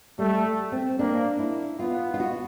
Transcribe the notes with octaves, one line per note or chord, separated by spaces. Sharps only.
G3 A3
C4
A#3 D4
E4
B3 F4
F4
F#4